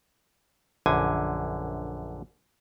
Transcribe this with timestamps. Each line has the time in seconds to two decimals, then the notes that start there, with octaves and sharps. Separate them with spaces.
0.86 A#1 F#2 D3 G#5